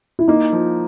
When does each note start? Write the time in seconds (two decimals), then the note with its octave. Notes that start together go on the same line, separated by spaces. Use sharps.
0.19 E4
0.28 A#3 D#4
0.53 F3